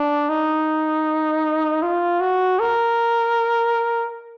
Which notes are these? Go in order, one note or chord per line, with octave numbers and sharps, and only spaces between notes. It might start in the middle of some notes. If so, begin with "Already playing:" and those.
Already playing: D4
D#4
F4
F#4
A#4